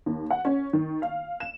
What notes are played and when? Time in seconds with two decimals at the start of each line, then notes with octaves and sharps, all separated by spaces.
0.06 D#2
0.30 F#5
0.45 C#4
0.73 D#3
1.02 F5
1.40 E7